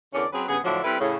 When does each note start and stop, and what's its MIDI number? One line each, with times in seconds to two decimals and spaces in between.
0.14 0.26 40
0.14 0.26 50
0.14 0.26 61
0.14 0.26 70
0.14 0.26 74
0.33 0.44 54
0.33 0.44 60
0.33 0.44 61
0.33 0.44 68
0.33 0.44 71
0.48 0.59 43
0.48 0.59 49
0.48 0.59 59
0.48 0.59 68
0.64 0.80 45
0.64 0.80 50
0.64 0.80 53
0.64 0.80 54
0.64 0.80 62
0.64 0.80 64
0.84 0.96 55
0.84 0.96 60
0.84 0.96 64
0.84 0.96 69
0.84 0.96 71
1.00 1.17 45
1.00 1.17 49